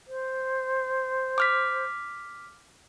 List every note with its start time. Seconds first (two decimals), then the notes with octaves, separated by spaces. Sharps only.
0.07 C5
1.38 D6 F6 B6